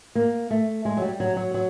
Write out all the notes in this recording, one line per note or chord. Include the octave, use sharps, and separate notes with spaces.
A#3
A3
G#3
F#3
G3
F#3
F#3
F#3